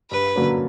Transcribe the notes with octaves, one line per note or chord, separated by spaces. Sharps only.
G2 B4
D3 F#3 A#3 C#4